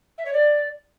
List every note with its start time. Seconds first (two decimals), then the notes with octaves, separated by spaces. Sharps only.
0.18 E5
0.25 C#5
0.33 D5